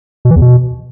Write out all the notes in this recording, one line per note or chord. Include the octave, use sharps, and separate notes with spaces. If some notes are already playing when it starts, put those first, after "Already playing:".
B2
E3
E2
B2